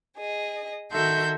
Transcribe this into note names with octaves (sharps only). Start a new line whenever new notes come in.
G#4 D#5
D#3 F#4 A4 E5 C6 G6